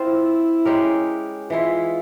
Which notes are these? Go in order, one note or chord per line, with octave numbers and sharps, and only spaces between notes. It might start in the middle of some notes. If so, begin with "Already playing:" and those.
Already playing: C4 E4 F4 C5
G#3 C#4 G4 A#4
E3 G#3 E4 F4